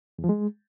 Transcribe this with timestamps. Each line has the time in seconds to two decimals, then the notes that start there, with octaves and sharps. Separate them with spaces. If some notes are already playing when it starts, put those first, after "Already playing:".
0.19 E2
0.24 F3
0.29 G#3